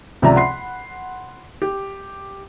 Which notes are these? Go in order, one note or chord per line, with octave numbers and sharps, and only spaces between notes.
C#2 C3 F3 D5 E5 A#5
F#5 B5 C6 C7
G4